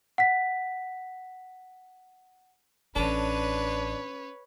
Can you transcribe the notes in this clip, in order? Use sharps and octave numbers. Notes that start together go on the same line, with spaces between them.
F#5 B6
A1 E3 C#4 D4 A4 B4 C#5